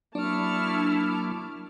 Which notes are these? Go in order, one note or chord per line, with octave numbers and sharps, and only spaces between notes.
F#3 A#3 D4 E4 A5 C#6 D6 F6